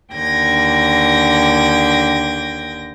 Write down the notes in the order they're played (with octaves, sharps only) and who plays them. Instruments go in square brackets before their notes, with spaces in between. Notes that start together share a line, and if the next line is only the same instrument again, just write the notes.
[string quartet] D#2 D3 G5 G#6 A#6